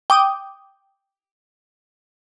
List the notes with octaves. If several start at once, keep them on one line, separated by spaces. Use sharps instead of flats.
G5 D6 D#6